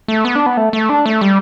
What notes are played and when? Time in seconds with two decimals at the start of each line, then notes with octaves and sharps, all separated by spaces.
0.08 A3
0.25 B3
0.35 D4
0.46 B3
0.57 A3
0.73 A3
0.89 D4
1.06 A3
1.21 G3